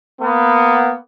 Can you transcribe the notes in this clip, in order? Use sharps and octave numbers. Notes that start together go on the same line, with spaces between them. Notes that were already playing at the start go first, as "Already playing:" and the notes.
A#3 B3